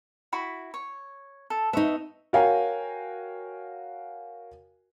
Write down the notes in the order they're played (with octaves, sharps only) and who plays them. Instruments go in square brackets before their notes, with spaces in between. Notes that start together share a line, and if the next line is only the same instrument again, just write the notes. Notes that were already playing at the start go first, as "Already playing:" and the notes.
[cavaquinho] E4 F#4 B5
C#5
A4
[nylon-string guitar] B3 D#4 [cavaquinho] E5 C#6
[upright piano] F#4 A#4 C#5 F5 G5 G#5